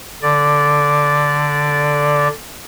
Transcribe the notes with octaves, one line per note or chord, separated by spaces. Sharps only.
D3 D5